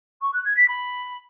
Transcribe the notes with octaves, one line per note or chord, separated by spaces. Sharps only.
C#6
F#6
G#6
B6
B5